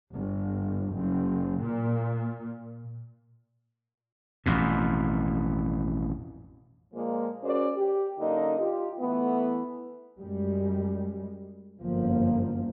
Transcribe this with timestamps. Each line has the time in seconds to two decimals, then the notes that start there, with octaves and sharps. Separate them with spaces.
0.13 G1
0.93 F#1
1.61 A#2
4.46 A1 F2 B2
6.93 A#2 F3 G#3 A#3
7.43 C#4 F#4 G#4 A#4 C5 D5
7.76 G4
8.19 F#2 D3 A#3 D#4 D#5
8.58 F4 G4
8.98 E3 A3 B3
10.19 F#2 G3 G#3
11.81 G1 F#2 F3 A#3